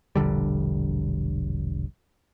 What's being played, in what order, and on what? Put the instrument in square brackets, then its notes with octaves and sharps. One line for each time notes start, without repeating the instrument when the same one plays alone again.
[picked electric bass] E1 A#1 D3 G3